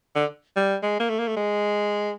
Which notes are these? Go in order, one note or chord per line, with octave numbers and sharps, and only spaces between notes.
D3
G3
G#3
A#3
A3
A#3
A3
G#3